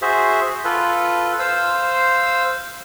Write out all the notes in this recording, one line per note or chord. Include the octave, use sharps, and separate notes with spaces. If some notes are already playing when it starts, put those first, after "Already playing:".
F#4 G#4 C5 E5
F4 A4 B4
C5 F5 E6